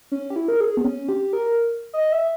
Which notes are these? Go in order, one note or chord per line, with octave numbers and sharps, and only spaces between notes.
C#4
G4
E4
A#4
G#4
B3
C#4
G4
A#4
D#5
E5